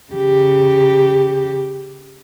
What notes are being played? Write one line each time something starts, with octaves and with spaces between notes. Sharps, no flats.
C#3 G4